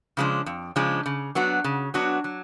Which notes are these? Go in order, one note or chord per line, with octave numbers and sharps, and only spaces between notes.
C#3 F3 G#3 D4
F2
C#3 F3 G#3 D4
C#3
F#3 B3 D4 F#4
C#3
F#3 B3 D4 F#4
F#3